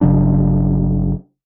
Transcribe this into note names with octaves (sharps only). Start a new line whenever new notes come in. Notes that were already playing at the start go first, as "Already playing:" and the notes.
G1 C#3 F#3 D4